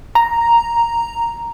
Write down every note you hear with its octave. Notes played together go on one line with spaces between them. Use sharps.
A#5